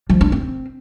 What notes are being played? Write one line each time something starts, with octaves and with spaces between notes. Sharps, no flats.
F3
D4
C4